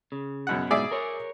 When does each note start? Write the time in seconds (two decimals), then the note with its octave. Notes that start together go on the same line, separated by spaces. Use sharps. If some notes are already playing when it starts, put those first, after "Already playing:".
0.12 C#3
0.47 F#2 B2 F#5
0.71 G#2 B2 G#4 D5 E5
0.91 A#4 C#5